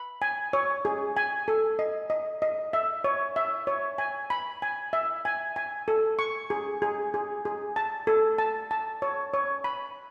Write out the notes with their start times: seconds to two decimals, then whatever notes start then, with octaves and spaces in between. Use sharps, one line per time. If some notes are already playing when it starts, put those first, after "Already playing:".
Already playing: B5
0.22 G#5
0.53 C#5
0.85 G#4
1.16 G#5
1.48 A4
1.79 D#5
2.10 D#5
2.42 D#5
2.73 E5
3.04 C#5
3.36 E5
3.67 C#5
3.98 G#5
4.30 B5
4.62 G#5
4.93 E5
5.25 G#5
5.56 G#5
5.88 A4
6.19 C#6
6.50 G#4
6.82 G#4
7.14 G#4
7.45 G#4
7.76 A5
8.07 A4
8.38 A5
8.71 A5
9.02 C#5
9.34 C#5
9.64 B5